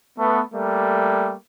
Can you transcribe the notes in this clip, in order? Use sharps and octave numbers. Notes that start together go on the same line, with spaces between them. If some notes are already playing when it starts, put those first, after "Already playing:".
A3 B3
G3 A3 A#3